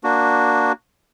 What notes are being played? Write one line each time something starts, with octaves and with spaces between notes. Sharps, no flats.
A#3 D4 F#4